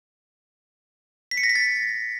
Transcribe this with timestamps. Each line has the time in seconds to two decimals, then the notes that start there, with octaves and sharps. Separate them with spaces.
1.31 B6
1.37 C#7
1.43 A#6
1.49 B6
1.55 A6